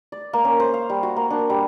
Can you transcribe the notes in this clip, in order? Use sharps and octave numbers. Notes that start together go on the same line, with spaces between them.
D5
A#3
C#4
C5
F5
G3
F#4
A#3
D4
G3